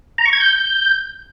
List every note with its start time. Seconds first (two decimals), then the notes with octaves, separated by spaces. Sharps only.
0.18 A#5
0.26 C#6
0.33 G#6
0.40 G6